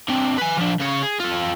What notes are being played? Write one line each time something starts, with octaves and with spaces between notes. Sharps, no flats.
D3 C4
B4 G#5
F3 D4
C#3 C#5
G#4
F4 A4